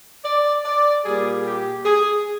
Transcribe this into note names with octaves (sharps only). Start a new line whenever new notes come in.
D5
D5
A#2 G3 G#4
G4
G#4